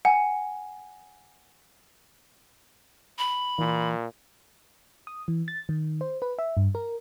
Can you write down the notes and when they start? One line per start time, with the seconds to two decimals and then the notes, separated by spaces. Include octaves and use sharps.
0.05 F#5 G#5
3.19 B5
3.59 A#2 E3
5.07 D#6
5.28 E3
5.48 A6
5.69 D#3
6.01 C5
6.22 B4
6.39 E5
6.57 G2
6.75 A#4